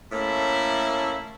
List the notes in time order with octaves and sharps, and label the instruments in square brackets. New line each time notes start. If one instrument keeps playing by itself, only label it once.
[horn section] A2 A3 A#3 C#4 E4 E5